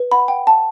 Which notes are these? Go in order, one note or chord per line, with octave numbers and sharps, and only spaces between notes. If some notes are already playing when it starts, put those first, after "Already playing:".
Already playing: B4
F#5 B5
F#5 G5
F#5 A5